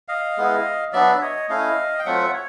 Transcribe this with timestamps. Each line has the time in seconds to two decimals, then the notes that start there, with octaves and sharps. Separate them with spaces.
0.08 D#5 F5
0.37 G#3 B3 E4
0.93 F#3 B3 D4 D5 E5
1.12 E5
1.21 C#5 D#5
1.49 A3 C#4 E4 D#5 F5
1.99 G5
2.06 F#3 A3 C4 F4 E5 F#5
2.33 C#5